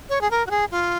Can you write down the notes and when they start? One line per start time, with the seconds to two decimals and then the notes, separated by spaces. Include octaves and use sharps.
0.09 C#5
0.21 G#4
0.31 A#4
0.47 F#4
0.51 G#4
0.71 F4